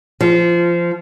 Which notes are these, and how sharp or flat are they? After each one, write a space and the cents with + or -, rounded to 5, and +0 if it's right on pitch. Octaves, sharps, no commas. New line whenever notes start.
F3 -20